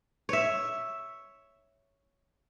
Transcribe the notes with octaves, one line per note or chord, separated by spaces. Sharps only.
C#5 E5